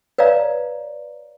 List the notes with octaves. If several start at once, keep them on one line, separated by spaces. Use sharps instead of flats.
B4 C#5 D5 F5 A#5